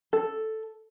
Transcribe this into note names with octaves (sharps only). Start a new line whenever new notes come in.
A4